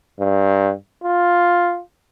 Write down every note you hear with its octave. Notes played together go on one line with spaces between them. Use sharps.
G2
F4